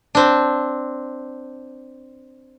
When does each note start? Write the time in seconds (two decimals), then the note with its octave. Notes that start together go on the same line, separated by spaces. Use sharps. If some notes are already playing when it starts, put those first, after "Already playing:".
0.15 C4 D4